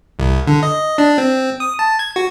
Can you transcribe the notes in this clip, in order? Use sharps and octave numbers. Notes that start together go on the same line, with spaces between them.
C2
D3
D#5
D4
C4
D#6
A5
G#6
F#4